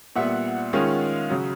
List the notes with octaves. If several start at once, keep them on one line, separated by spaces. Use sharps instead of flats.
A#2 G3 B3 E5 F#5
D#3 G#3 C#4 F4
C#3 F#3